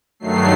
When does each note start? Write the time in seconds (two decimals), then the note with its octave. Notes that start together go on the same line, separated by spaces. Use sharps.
0.20 G2 D#3 F#3 A3 C7